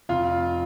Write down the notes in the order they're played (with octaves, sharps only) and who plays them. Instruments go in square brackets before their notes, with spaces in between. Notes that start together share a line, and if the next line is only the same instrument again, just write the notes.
[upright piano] F1 F4 F5